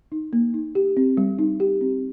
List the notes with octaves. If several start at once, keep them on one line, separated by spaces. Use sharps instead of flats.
D#4
A#3
D#4
G4
C4
G3
D#4
G4
C4